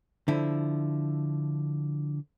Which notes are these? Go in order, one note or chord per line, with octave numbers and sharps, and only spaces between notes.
D3 F3 E4